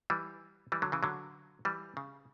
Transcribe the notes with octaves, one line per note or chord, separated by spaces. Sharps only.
E3 G3
E3 G3
D3 F#3
C#3 E3
D3 F#3
E3 G3
C#3